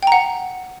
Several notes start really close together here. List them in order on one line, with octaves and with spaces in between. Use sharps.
G5 A#5 F#5